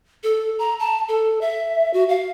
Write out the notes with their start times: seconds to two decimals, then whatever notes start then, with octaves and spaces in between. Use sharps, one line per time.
0.24 A4
0.59 A#5
0.80 A5
1.08 A4
1.41 E5
1.93 F#4
2.09 F5